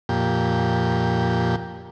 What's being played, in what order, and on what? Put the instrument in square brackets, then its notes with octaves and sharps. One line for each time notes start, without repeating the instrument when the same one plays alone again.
[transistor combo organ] F2 A#2 G4